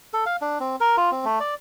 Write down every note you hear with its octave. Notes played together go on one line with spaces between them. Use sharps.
A4
F5
D4
C4
A#4
F4
C4
A3
D5